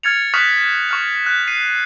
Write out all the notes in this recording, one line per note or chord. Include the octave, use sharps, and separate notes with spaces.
F6 G#6 A6 C#7 F7
C#6 D#6 F6 F#6 B6 F7
C#6 F6 F7
F#6
C7 D#7